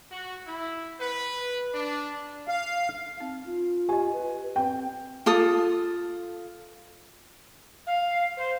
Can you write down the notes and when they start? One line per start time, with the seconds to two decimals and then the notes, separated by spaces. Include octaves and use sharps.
0.11 F#4
0.47 E4
1.00 B4
1.74 D4
2.48 F5
3.20 C4 D#4
3.46 F4
3.89 G4 D#5 G#5
4.13 B4
4.56 C4 G5
5.26 F4 A4 D#6
7.86 F5
8.36 C5